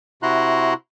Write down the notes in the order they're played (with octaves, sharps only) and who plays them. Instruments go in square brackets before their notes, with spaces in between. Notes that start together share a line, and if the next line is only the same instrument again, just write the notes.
[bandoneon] C3 E4 F#4 A#5 C6 F#6